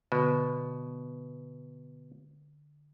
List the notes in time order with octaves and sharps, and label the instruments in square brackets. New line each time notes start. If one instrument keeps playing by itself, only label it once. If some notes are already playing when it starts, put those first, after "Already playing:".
[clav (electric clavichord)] B2 [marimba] D3